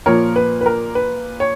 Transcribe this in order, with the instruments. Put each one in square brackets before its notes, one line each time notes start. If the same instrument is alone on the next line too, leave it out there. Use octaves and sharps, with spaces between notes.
[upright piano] A#2 F3 A#3 A#4 C#5
B4
B4
A#4
B4
C#5